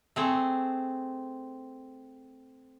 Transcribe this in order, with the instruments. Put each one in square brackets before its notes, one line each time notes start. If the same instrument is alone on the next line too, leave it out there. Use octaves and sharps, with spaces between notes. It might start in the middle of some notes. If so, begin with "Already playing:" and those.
[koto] A3 C4 G#4